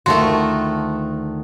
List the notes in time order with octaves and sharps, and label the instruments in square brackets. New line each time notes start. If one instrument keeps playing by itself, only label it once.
[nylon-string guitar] D2 D#3 A5 [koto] A3 F4 F#4 [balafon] C6